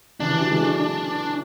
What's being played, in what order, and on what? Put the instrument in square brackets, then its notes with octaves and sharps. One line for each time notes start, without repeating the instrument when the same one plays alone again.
[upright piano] C#3 E3 [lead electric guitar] D4
[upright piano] C#3 E3
D3 F#3
E3 G#3
F#3 A3